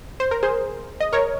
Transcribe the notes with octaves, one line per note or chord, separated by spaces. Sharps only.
C5
A#4
G#4 C5
D#5
A#4 C#5